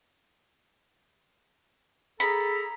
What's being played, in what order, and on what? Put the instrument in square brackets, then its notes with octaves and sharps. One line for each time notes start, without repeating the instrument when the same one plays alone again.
[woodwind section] G#4 A4 A#5 [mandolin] B5